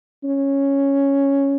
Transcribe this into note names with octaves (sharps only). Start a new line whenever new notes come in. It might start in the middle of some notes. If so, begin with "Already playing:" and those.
C#4